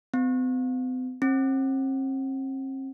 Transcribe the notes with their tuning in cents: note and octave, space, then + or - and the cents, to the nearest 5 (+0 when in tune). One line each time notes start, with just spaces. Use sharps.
C4 -45
C4 +40